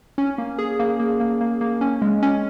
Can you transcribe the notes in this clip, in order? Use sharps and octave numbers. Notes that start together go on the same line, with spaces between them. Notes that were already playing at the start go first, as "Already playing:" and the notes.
C#4
A#3
G#4
A#3
A#3
A#3
A#3
A#3
C#4
G#3
C#4